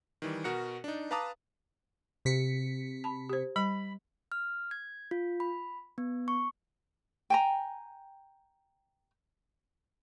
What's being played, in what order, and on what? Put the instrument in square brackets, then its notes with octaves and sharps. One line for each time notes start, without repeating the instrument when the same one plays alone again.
[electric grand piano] D#3 E3 G3
B2 F#4 A#4 F#6 C#7
D4 D#4
B4 F5 A5 A#5 D6 D#6
[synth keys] C3 B6 C#7
[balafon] A5 B5
G4 C5
[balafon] G3 [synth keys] B5
[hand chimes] F6
G#6
F4
B5
B3
C#6
[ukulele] G5 G#5 A#5